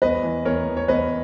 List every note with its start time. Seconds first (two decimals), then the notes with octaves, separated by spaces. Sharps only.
0.02 E2 B4 D#5
0.23 E3
0.45 E2 A#4 C#5
0.67 E2
0.77 C#5
0.88 E2 B4 D#5